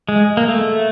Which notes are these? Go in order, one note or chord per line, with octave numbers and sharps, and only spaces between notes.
G#3
A#3
A3